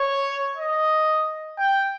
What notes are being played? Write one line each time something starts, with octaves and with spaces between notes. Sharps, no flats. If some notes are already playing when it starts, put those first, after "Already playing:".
Already playing: C#5
D#5
G5